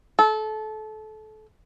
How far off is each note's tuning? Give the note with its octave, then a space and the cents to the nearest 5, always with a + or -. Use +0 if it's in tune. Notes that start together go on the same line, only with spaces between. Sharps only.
A4 -25